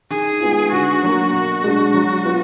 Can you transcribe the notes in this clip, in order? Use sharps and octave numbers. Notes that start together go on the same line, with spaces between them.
D#3 G#4
G#3 B3 F4
D3 F#4
F#3 A#3
B2 F#4
G#3 D4
F#3
B3 F4